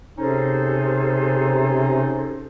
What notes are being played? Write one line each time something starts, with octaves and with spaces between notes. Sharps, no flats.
C3 C#4 D#4 G#4 A4 C5